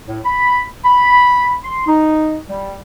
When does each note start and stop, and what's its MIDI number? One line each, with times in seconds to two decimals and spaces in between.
0.07 0.19 45
0.25 0.62 83
0.84 1.52 83
1.63 1.83 84
1.86 2.36 63
2.48 2.76 55